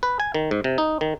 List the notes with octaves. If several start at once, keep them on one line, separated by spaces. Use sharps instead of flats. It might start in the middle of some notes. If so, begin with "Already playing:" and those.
B4
G#5
D#3
G#2
C3
D#4
D#3